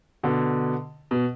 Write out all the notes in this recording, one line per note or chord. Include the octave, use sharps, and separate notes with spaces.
B2 D3
B2